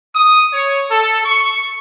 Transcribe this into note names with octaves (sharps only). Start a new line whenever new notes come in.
D#6
C#5
A4
C#6